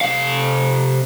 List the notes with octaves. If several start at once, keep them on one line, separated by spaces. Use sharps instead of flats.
C3 F5